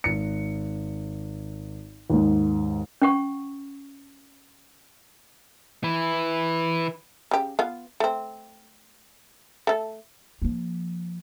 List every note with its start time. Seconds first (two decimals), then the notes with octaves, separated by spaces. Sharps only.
0.04 G#1 C#7
2.10 D#2 G#2
3.02 C#4 F#5 C#6
5.84 E3 E4
7.31 C#3 G4
7.59 B3 F4 F5
8.00 A3 C4
9.67 A3 A4
10.42 F3 A#3